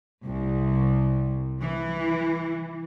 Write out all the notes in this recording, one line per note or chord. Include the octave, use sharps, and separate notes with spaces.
C2
E3